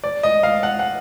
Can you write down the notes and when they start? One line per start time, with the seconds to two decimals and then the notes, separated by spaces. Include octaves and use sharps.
0.04 D5
0.23 D#5
0.43 F5
0.63 F#5
0.79 F#5